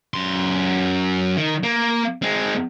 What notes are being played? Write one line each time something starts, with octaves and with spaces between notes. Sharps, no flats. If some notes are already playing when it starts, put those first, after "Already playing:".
F#2 C6
D#3
A#3
G#3 C4